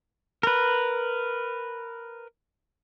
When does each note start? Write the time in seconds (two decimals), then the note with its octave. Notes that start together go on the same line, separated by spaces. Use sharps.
0.43 A#4 B4